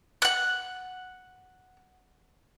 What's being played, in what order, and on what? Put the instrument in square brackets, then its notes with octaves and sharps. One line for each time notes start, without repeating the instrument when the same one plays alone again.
[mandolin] F#5 F#6